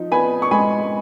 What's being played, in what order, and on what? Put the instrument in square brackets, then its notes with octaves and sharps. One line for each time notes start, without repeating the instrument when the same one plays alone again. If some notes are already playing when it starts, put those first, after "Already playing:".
Already playing: [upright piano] F3 D#4
B3 G#5 B5
C#6
G#3 G#5 B5